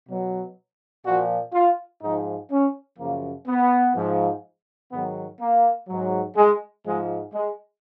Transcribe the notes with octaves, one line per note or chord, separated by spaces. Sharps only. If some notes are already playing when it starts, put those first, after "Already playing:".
B2 F#3
A#2 F3 F#4
F4
G#2 F3 D#4
C#4
F#2 C#3 F3 A#3
B3
G#2 F3
G#2 D#3 F#3 B3
A#3
G#2 F#3
G#3
G#2 F3 G#3
G#3